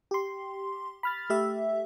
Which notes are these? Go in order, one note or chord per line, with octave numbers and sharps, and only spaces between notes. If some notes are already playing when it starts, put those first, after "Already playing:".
G4 C6
B5 F6 A6
A3 G4 E5